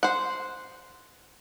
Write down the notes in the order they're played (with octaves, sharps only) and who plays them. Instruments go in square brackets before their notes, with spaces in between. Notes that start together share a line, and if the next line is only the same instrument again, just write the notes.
[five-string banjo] C5 F#5